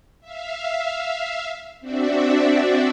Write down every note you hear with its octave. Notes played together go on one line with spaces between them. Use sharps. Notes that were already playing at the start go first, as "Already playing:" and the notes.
E5 F5
C4 D4 F#4 D5 E5